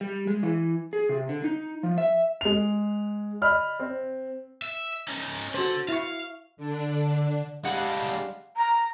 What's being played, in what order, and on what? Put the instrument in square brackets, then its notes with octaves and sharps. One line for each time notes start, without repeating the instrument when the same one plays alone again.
[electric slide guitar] G3
G#3
E3
G#4
C3
D3
D#4
F3
E5
[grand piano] G#3 F7
D5 D#5 B5 F6
C4
[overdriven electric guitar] E5
C#4 D#4
[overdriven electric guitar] D3 [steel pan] F#4 C5
[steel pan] E4 C#6 [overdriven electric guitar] F5
[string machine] D3 D4
[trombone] G3 [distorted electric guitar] G#3 D4 [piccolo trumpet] F5 [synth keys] F#5
[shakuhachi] A#5